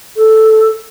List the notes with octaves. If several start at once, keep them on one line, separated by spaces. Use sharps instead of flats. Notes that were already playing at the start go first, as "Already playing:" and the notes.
A4